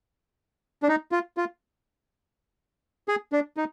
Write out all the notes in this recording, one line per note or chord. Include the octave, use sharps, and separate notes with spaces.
D4
D#4
F4
F4
G#4
D4
D#4